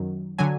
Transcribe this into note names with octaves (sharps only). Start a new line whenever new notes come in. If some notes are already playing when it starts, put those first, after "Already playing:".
Already playing: F#2 D#3 F#3
D3 F#3 G#5